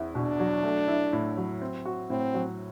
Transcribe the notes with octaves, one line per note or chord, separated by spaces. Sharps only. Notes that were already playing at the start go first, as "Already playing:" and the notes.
Already playing: E2 C4 E4
B2 D4
F#3
A3
E4
A2
F#3
C4
F#4
A2 C4
F#3